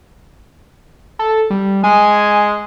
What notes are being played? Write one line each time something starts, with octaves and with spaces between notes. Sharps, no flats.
A4
G3
G#3 G#5